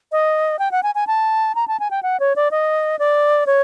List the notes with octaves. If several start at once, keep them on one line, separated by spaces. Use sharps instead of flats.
D#5
G5
F#5
G#5
G#5
A5
A#5
A5
G#5
G5
F#5
C#5
D5
D#5
D5
C#5